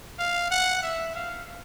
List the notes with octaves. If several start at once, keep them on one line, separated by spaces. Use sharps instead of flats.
F5
F#5
E5
F5